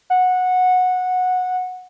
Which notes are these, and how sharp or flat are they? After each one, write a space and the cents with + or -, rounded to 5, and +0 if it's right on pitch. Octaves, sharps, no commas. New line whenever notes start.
F#5 -15